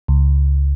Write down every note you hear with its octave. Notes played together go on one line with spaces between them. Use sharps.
C#2